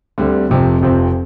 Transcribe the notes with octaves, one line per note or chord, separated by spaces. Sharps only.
D2 D3 G3 C4
F1 F2 C3 F3 C4
F1 F2 C3 F3 C4